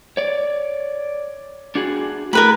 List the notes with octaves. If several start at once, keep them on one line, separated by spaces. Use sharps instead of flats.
C#5 D5
D4 F#4 G#4
A2 A#4 B4 B5